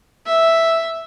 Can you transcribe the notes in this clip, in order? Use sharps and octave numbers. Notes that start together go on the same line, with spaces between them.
E5